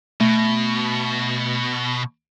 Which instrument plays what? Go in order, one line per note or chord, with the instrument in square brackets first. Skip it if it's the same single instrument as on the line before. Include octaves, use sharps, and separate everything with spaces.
[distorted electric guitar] B2 [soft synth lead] A3